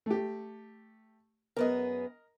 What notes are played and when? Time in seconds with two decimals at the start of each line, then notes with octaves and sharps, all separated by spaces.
0.06 A3 G4
1.56 F#2 B3 G#4 A#4 D#5